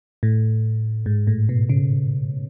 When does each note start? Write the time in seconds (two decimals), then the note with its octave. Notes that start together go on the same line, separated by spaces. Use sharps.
0.23 A2
1.06 G#2
1.27 A2
1.49 B2
1.69 C#3